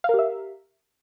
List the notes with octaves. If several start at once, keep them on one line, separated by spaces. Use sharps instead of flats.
G4 A#4 E5 F5